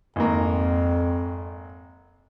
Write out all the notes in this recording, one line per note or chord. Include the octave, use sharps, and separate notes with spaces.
G#1 F2 A#3